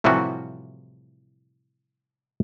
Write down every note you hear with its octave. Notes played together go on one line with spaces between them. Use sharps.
A2 C3 E3 F3 G3 F#4